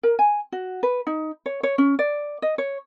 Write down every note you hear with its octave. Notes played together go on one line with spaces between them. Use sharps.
A#4
G#5
F#4
B4
D#4
C#5
C#5
C#4
D5
D#5
C#5